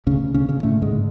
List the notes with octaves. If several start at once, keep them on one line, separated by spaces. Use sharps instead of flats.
D2 C#3 C#4
D2 C#3 C#4
C#3 C#4
A2 D3 A3
G#2 G#3
D3